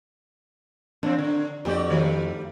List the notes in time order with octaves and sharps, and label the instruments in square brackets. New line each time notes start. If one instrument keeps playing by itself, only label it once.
[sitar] E2 F3 C4 [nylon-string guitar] D4
[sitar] D3
[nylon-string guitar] F2 C4 [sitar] F#4 G4 D5
[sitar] D#3 G3 A3